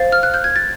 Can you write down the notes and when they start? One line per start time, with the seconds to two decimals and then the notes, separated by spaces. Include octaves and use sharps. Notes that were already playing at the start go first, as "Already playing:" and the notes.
Already playing: C5 F5 A6
0.12 F6
0.23 F#6
0.34 G6
0.44 G#6
0.56 A6